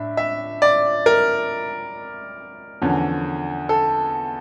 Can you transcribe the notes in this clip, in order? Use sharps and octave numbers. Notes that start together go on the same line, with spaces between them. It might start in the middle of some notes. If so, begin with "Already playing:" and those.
Already playing: A2 D4 E5
E5
D5
A#4
E2 D3 F3 C#4
A4